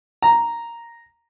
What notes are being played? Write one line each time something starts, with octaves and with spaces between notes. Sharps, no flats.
A#5